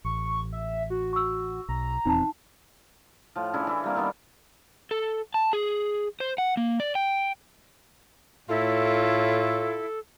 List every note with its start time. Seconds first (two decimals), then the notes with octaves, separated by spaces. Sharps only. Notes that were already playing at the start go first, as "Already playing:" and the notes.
0.05 A1 C#6
0.52 E5
0.90 F#4
1.13 C#6 E6
1.69 B1 A#5
2.05 D#1 E2 C4 D#4 A5
3.36 A2 F3
3.54 C#4 D4 E4 G#4
3.67 E3 E4 E5
3.84 G3 A#3 C4
3.96 D#3 G3 B3 D4
4.91 A4
5.34 A5
5.53 G#4
6.20 C5
6.38 F#5
6.57 A#3
6.80 D5
6.95 G5
8.49 A2 E4 F4 A4 C#5